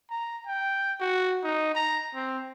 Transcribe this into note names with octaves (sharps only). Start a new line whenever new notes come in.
A#5
G5
F#4
D#4
A#5
C4